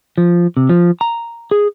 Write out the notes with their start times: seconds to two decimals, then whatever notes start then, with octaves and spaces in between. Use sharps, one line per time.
0.18 F3
0.57 C3
0.70 F3
1.01 A#5
1.51 G#4